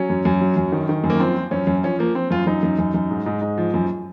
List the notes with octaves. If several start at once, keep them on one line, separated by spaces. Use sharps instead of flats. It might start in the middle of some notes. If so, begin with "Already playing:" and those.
Already playing: F#3 C#4
F#2
F#2
F#3
F#2
D#3
D#3
F#2
A#3
F3 C4
F3
F#2 C#4
F#2
F3 C#4
F3 A#3
F3 C4
F#2 F4
F#2 D#4
F#2
F#2
F#2
G#2
G#2
G#2
F3
F#2